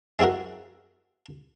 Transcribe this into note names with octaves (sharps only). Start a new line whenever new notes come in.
G#3 C4 E4 F#4 A#4